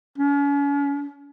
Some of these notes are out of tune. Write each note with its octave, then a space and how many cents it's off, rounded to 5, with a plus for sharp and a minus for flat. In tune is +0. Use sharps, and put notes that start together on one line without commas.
C#4 +40